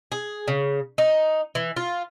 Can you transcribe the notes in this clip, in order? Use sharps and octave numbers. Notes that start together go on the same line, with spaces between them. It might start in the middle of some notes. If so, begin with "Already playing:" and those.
G#4
C#3
D#4
E3
F4